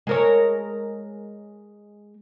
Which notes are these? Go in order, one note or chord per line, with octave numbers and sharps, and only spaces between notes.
G#3 A#4 C#5